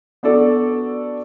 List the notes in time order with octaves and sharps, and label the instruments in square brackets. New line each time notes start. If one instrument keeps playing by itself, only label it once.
[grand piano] B3 D4 F#4 A4 D5